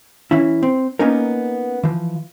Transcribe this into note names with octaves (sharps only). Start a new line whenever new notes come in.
E3 C#4 E4
C4
A#3 B3 C#4 D#4 A#4
E3 F3